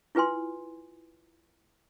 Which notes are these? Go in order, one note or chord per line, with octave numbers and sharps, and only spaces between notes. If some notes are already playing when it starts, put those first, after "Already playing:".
E4 F4 B4 G#5 C6